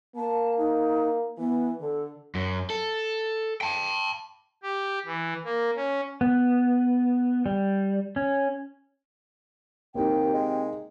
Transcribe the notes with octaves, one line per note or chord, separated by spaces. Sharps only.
A#3 A5
D#4
E3 B3
D3 A4
F#2
A4
G5 A5
G4
E3
A#3
C#4
B3
G3
C#4
D#2 C3 A#3 D#4 G5
G#3